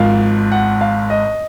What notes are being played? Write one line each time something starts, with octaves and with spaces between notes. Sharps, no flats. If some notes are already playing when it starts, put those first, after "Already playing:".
Already playing: G#1 G#2 F3 F5
F#5
F5
D#5